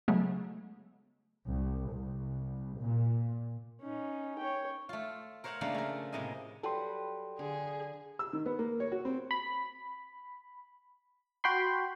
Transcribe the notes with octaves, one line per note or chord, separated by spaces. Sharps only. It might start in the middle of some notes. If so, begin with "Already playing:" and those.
C#3 F#3 G#3 A3 B3
C2
C2
A#2
C#4 D#4
C#5 G5
A3 F4
A#4 C5 C#5 F5 F#5 A#5
C#3 F3 A3 A#3 D4
A3 A#4
A2 C3 A#3 D#5 G#5
F#3 G3 A4 B4 G5 C6
D3 G#4
E6
D#3
B3
A#3
C#5
F#4
C4
B5
F#4 G5 B5 C6